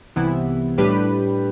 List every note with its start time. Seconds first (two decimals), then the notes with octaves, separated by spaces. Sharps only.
0.16 C2 C3 E3 B3 E4
0.78 A2 G3 D4 G4 B4